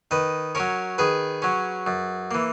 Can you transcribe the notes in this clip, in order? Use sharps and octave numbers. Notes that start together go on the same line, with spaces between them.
D#3 B4 D#5
F#3 C#4 A#4 C#5
D#3 G#4 B4
F#3 C#4
F#2
E3 A#3